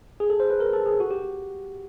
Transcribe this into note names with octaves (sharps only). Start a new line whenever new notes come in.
G#4
A4
C5
B4
A#4
A4
G#4
F#4
G4